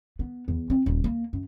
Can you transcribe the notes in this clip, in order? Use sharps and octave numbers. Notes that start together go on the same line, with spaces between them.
B3
E2
C4
D#1
A#3
F#2